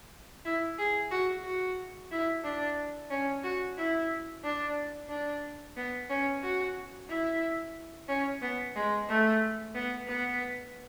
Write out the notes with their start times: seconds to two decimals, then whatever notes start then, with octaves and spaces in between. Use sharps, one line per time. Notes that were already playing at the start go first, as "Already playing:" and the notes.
0.45 E4
0.78 G#4
1.11 F#4
1.44 F#4
2.11 E4
2.44 D4
3.10 C#4
3.43 F#4
3.78 E4
4.44 D4
5.09 D4
5.76 B3
6.09 C#4
6.43 F#4
7.09 E4
8.08 C#4
8.42 B3
8.76 G#3
9.09 A3
9.75 B3
10.07 B3